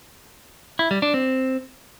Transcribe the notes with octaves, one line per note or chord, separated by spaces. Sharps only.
E4
G3
D4
C4